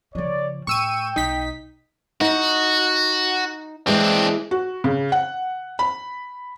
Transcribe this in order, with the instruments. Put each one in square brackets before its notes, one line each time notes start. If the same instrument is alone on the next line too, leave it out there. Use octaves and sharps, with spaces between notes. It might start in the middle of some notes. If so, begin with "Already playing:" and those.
[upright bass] C#3 F3 [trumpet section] C#5 D5
[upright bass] A2 [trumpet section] G5 [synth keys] C#6 E6 D#7
[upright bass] B1 [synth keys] D#4 B6
[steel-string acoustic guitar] D#4 [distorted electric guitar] F#4
[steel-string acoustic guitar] E3 G#3 [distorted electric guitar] C4 D4
[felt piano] F#4
C#3
F#5
B5